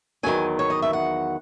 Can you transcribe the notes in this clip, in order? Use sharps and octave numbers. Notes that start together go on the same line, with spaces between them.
E2 D#3 F#3 G#5
C#5
D#5
E5
F#5